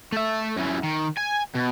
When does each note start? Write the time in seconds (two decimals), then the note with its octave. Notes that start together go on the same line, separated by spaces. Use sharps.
0.12 A3 E5
0.57 F#2 E3
0.83 D#3
1.17 G#5
1.55 B2